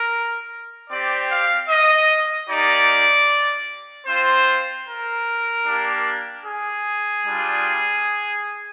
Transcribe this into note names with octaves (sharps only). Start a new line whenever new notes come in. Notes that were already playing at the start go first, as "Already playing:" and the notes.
Already playing: A#4
C4 G4 D5
F5
D#5
A#3 D#4 G4 D5
C4 F4 C5
A#4
A#3 D4 G4
G#4
G3 D4 F4